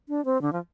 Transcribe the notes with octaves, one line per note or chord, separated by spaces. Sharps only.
D4
C4
D3
F3